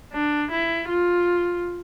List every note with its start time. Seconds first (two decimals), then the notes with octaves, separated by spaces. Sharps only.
0.13 D4
0.51 E4
0.89 F4